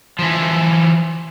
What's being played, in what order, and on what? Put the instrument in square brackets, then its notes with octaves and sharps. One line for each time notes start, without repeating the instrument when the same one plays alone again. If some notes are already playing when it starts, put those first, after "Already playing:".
[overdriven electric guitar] E3 F3